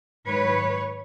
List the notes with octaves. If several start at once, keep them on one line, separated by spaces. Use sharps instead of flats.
G#2 D#3 F#3 B4 C#5